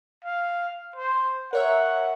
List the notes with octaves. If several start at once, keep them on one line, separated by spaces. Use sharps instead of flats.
F5
C5
A#4 C#5 E5 F#5